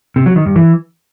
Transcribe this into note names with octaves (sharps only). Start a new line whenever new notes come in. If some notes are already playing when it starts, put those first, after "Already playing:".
C3
F#3
D#3
G2
E3